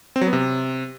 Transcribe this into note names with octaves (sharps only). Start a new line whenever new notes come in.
C4
F#3
B3
C3